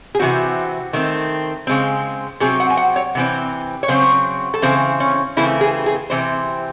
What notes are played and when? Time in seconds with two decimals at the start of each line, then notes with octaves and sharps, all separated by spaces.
0.15 G#4
0.19 C3 E3 C4 F#4
0.93 D#3 A3 C4
1.67 C#3 G#3 C4
2.40 C3 F#3 C4 G#4
2.60 F#5
2.70 G#5
2.77 F#5
2.96 C#5
3.15 C3 E3 C4
3.83 C#5
3.88 C#3 F#3 C4 C5
4.54 A4
4.62 C#3 E3 C4 C5
5.00 C#4
5.37 C#3 E3 A3 C4 E4
5.61 G#4
5.86 G#4
6.10 C3 E3 C4 C5